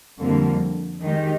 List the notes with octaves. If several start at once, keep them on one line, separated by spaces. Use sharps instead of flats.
F2 D3 G3 A#3
D#3 G#3 D#4 G4